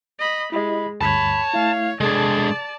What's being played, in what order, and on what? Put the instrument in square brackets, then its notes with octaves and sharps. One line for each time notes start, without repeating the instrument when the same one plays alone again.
[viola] D#5 B5
[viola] G#3 [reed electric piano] E4 G4 D#5 [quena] B5
[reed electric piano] D2 G2 [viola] C#5 [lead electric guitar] A5 [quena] B5
[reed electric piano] A3 E4 [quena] F5
[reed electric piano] C3 A4 [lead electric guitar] G#3 D4 [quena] G#4 [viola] D5 A5